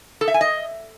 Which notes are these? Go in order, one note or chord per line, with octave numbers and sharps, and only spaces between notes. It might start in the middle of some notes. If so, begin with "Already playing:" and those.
A4
E5
G#5
D#5